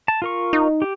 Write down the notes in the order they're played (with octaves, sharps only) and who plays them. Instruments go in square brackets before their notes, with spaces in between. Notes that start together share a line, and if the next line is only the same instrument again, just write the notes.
[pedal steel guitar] A5
F4 A#4 C#6
[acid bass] D#4
[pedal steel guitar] G4